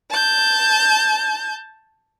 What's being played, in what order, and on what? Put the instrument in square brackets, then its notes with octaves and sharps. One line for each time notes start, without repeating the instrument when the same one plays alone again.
[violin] A5 G6